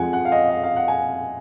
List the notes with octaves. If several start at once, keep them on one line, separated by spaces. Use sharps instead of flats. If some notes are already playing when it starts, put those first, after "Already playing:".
Already playing: F2 F3 G#3 F#5 G#5
F#5
F5
D#5
F5
F5
F#5
G#5